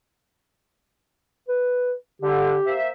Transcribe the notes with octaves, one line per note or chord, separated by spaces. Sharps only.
B4
D3 G4
A#3 C5 E5